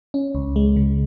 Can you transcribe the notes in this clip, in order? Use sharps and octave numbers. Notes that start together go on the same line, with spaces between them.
C#4
C#2
G#3
C#3